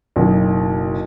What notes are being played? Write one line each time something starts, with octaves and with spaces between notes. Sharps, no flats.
F#1 B1